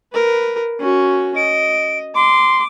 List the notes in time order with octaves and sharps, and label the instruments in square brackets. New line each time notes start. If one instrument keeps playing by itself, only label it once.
[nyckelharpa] A#4 B4
C#4 F#4
[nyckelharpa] D#5 [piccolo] D7
[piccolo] C6 [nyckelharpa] D6